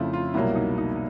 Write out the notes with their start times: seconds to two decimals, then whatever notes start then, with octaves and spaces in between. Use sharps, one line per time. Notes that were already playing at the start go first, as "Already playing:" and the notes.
Already playing: F2 C#3 F3 A3 E4 F4
0.13 F4
0.34 C2 B2 F#3 A#3 E4
0.55 D#4
0.78 D#4